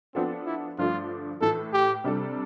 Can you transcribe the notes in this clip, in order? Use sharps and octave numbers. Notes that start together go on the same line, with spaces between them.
F3 B3 C4 D4 A4
E4
G2 D3 F3 A3 D4 F4
A2 E3 A3 A4
G4
C3 G3 D4 A4